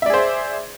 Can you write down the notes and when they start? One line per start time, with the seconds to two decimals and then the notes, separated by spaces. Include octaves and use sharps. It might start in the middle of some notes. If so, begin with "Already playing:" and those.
0.02 E5
0.06 D5
0.10 G#4
0.14 C5